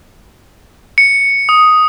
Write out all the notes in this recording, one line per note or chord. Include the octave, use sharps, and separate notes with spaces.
C#7
D#6